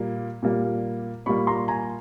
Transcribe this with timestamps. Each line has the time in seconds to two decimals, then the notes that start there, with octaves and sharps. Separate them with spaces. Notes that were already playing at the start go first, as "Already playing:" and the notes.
Already playing: A#2 G3 A#3
0.43 A#2 G3 A#3
1.26 A#2 G3 A#3 B5 C#6
1.47 A#5 C6
1.68 G#5 A#5